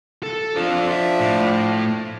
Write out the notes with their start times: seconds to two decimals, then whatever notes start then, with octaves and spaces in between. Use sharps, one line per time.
0.23 A4
0.56 F3 D4 F4 A4
0.91 E5
1.20 A2